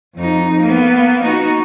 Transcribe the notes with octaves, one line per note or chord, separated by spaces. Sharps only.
F2 D#4
A#3 B3
D#4 F#4